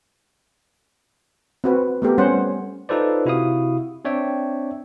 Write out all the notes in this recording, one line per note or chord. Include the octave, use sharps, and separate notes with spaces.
C4 F#4 B4
A3 B3 G4 A#4
G3 B3 C#4 C5 F#5
D#4 F4 A4 B4 C5 D5
C3 E4 F#4 F5 D#6
C4 D4 C#5 D5 E5 G5